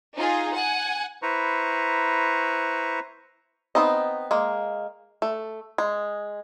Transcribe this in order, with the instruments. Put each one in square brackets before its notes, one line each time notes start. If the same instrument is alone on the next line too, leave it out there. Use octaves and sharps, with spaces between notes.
[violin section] D#4 F4 G#4
F#5 G#5
[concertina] E4 B4 C5 A#5 C#6
[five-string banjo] B3 C4 D#4 D#5
G#3 A#3
A3
G#3